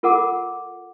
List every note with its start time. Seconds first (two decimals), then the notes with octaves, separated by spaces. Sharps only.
0.03 F4 A4 A#4 F#5 D6